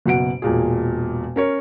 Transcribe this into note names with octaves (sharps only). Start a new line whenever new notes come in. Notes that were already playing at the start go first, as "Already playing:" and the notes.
F#1 B2 F#5 D7
E1 A#2 G#4
C#4 A#4 C#5